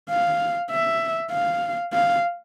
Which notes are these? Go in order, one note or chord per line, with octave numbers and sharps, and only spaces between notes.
F5
E5
F5
F5